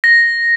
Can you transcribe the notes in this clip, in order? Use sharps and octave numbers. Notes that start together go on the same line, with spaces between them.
A#6